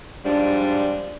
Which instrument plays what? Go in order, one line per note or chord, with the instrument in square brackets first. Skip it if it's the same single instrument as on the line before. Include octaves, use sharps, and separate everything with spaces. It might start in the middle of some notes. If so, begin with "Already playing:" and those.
[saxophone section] G#2 F3 G3 D4